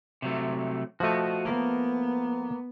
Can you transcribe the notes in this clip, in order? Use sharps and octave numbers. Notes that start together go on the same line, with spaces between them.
C3 F#3 A3
F3 A3 F#4 D#5
A#3 B3